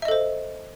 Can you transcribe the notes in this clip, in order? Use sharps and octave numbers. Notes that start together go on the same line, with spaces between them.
A4 C5 D#5 E5